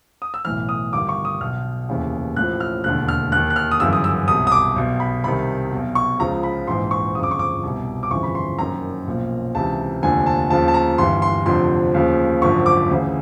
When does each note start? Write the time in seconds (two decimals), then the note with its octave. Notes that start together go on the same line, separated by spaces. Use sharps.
0.22 D#6
0.34 E6
0.45 B1 A2 E3 F6
0.69 D#6
0.93 G1 G2 D#3 D6
1.09 C#6
1.25 D#6
1.41 B1 B2 F6
1.89 F1 D#2 C#3 E3
2.36 A1 A2 F3 F#6
2.60 F6
2.84 E1 D#2 D3 F#6
3.08 F6
3.32 D#2 D#3 F#6
3.50 F#6
3.56 F6
3.71 D#6
3.80 G1 F#2 C#3 E3 E6
3.93 D#6
4.04 E6
4.28 C2 B2 D#6
4.47 D#6
4.52 D6
4.76 B1 B2
5.00 B5
5.24 C2 C3 D#3 B5
5.72 B1 B2
5.95 C#6
6.19 C#2 C#3 F3 A#5
6.43 B5
6.67 A#1 G#2 E3 C6
6.91 C#6
7.15 G1 F2 C#3 D#6
7.23 D6
7.31 C#6
7.39 D6
7.63 C2 B2
8.03 D6
8.11 G1 F2 C#3 E3 C#6
8.23 B5
8.35 C6
8.58 F#1 F#2 D#3 A#5
9.07 B1 A#2 F3
9.55 C#2 C3 E3 A5
10.03 F1 D#2 D3 F3 G#5
10.26 A5
10.50 D#2 C#3 F3 A5
10.68 A5
10.74 A#5
10.98 G1 G2 E3 C6
11.22 C6
11.46 F1 F2 D3 F3 C6
11.94 D#2 C#3 F3
12.42 G#1 F#2 D3 F3 C#6
12.66 D6
12.90 D2 C#3 E3